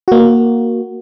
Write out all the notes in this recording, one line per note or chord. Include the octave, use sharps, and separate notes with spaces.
A#3 F#4